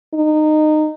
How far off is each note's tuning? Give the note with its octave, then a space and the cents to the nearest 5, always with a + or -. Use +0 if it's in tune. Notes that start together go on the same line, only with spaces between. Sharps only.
D#4 -20